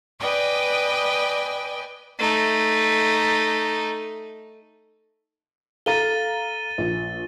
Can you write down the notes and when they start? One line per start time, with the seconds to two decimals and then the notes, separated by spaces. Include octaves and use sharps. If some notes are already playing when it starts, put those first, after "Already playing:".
0.19 B4 D5 D#5 G5 G#5
2.19 A3 D#4
5.86 A4 F5 A#5 A6 D#7 G7
6.78 A#1